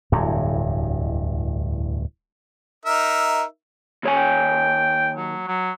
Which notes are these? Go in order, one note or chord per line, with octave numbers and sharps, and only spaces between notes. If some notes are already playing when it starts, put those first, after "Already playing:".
D1 E2 G2
D#4 A#4 E5
D#2 C#5 G#5
G5
F#3
F#3